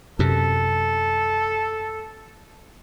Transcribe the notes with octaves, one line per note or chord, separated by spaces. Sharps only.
F#2 C3 A4